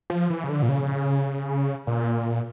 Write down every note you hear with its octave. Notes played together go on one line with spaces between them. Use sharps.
F3
E3
C#3
D3
A#2
C#3
A#2